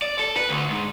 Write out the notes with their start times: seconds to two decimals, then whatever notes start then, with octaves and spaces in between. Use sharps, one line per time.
0.02 D5
0.19 A4
0.36 B4
0.49 D2
0.71 G#2